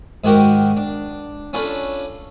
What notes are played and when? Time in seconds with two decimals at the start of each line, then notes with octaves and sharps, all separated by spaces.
0.24 G#2 D#3 F#4 G4 A#4
0.77 D4
1.53 C#4 D4 F4 A4 B5